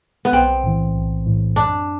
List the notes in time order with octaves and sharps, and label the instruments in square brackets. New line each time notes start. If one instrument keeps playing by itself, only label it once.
[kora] B3
[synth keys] B1 [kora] C4
[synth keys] A2 E3
B1
A2 E3
[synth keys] F#2 [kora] D4